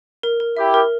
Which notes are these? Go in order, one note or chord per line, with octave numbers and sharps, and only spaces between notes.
A#4
A#4
E4 G4 E5
A#4